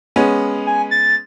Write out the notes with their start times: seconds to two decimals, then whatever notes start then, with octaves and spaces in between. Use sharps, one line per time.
0.16 G#3 B3 C#4
0.67 G#5
0.91 A6